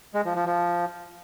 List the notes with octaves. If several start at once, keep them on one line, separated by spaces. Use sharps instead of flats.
G#3
F3
F3
F3